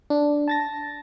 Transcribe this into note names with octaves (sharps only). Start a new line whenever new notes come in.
D4
A5 A6 A#6